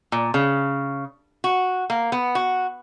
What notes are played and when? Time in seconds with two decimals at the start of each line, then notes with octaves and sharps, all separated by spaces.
0.12 A#2
0.34 C#3
1.44 F#4
1.90 A#3
2.12 B3
2.35 F#4